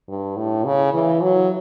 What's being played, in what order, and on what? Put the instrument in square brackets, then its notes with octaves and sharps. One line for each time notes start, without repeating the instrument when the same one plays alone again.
[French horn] G2
A2
C#3
E3
F#3